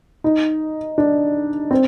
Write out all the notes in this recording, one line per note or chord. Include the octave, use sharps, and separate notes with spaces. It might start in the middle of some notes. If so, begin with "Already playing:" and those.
D#4
D4
C4